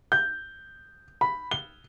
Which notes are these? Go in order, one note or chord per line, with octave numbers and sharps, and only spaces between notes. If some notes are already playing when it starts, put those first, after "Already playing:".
G6
B5
G7